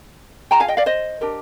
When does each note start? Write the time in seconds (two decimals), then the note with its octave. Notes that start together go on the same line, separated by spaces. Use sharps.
0.51 F4 G#4 G5 A#5
0.60 F5 G#5
0.68 D#5 G5
0.77 D5 F5
0.86 C5 D#5
1.21 D4 G4 A#4